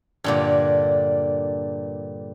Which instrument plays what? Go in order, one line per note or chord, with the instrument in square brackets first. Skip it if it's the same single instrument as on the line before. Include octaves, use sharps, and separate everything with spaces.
[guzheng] G2 A#2 D3